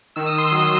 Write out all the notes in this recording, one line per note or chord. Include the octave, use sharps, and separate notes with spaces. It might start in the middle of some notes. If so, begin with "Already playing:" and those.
D#3 E6
D#6
D#3 C6
F#3 D#6